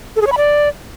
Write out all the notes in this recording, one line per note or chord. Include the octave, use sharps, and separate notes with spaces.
A4
G#4
C#5
B5
D5